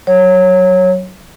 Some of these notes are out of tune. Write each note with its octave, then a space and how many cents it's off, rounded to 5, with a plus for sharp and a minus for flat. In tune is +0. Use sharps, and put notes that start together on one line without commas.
F#3 +10 C#5 -15